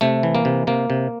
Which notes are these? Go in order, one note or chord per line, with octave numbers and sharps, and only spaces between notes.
C3 A3
E3
A#3
C3
C3 A#3
C3